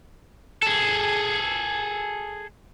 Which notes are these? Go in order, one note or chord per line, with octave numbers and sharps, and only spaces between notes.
G#4 A4